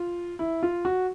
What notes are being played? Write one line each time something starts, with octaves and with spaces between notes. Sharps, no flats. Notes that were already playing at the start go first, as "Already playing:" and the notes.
Already playing: F4
E4
F4
F#4